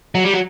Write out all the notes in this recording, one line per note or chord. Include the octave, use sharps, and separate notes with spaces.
F#3
G3
F#3